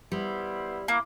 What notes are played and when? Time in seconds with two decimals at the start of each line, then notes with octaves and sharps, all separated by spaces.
0.12 G3 B3 E4 C5
0.88 A#3 E4